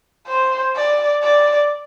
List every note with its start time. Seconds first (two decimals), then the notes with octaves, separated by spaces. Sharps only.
0.27 C5
0.76 D5
1.23 D5